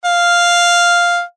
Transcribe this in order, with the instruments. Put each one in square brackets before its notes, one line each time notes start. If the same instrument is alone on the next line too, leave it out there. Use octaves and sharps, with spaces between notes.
[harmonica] F5